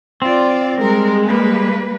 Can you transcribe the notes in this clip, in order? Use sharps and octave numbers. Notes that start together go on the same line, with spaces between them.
C4 F4 D5
G3 G#3 A#4
G3 A#3 B4